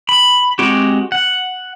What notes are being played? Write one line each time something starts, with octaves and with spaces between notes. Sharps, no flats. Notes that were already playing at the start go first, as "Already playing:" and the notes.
B5
G#3 C4 F#4 G4
F#5